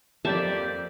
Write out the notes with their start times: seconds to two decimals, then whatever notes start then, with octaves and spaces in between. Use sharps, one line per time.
0.25 F2 A#3 G4 D5 E5 A5